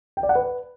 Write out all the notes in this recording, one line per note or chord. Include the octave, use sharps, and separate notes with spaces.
G5
D5
F#5
B4